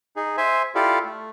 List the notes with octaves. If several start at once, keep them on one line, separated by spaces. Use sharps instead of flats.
D#4 G#4
C5 E5 G#5
E4 F4 G4 A4 D5 F5
A3